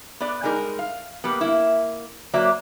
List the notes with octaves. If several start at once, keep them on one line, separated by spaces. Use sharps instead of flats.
B3 D5
G3 G#3 D#4 A#4
F5
G3 A#3 B3
A#3 E4
F#3 A#3 C5 D5 E5